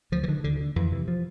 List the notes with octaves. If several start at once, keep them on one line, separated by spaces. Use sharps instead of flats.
D2 F3
E3
D3 D#3
D2 D3
D3
F2 E3
C3 E3
F3